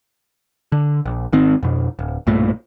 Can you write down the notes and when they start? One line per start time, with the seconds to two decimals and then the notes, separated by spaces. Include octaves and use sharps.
0.72 D3
1.06 A#1
1.33 G#1 D#3 C4
1.63 F2 B2
1.99 D1
2.27 B1 G2 A#2 A3